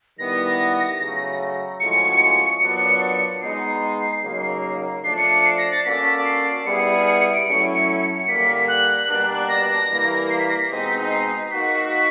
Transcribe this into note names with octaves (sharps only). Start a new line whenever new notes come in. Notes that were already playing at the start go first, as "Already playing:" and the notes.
D#3 G3 B3 E4 A#6
C#3 F#3 A3
A2 F3 G#3 C#4 F#4 C#7
A#2 F#3 B3 D4 C#7
G#3 B3 D#4 C7
C#3 F#3 A#3 D#4
F3 A3 D4 C7
C#7
C#7
C7
A#6
A6
A#3 C#4 F#4 A4 D5 B6
C7
G3 B3 E4 G#4 C#7
C#7
C#7
D7
F#3 A3 C#4 E4 C#7
C#7
C#7
C#7
D3 G3 A#3 B6
F#6
B2 G3 A#3 D4
A#6
E3 G3 A#3
C7
B6
A#6
B6
B2 G#3 C4 D#4
C7
A#3 D#4 F#4 B6
B6